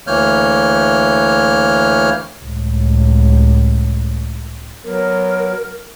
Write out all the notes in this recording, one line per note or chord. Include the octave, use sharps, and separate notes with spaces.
D2 E3 A#3 C#5 F6 G6
C#2 A2
F#3 B3 A#4